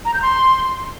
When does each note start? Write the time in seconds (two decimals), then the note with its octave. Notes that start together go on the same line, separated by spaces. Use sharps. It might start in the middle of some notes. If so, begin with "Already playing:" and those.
0.05 A#5
0.14 G6
0.22 C6